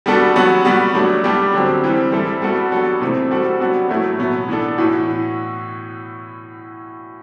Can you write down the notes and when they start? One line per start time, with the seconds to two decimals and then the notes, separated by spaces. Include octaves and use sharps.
0.06 G3 B3 D4 F#4 A4
0.36 F#3 B3 F#4
0.65 G3 B3 F#4
0.94 F#3 A3 D4
1.24 G3 B3 D4 G4
1.54 D3 F#3 C4 G4
1.84 E3 G3 C4
2.12 G3 C4 E4 A4
2.42 G3 B3 F#4 A4
2.72 F#3 B3 D4 F#4 A4
3.01 C3 E3 A3 C4
3.31 G3 C4 F#4 A4
3.60 F#3 B3 D4 F#4
3.89 A2 F#3 A3 E4
4.19 B2 F#3 B3
4.48 E3 B3 D4 A4
4.78 A2 E3 B3 F#4